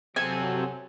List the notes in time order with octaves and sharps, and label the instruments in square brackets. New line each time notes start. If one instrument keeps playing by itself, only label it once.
[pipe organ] C3 F#3 [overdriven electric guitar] C4 A4 [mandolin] G#5